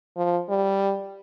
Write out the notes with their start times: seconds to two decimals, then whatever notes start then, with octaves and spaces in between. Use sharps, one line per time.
0.16 F3
0.49 G3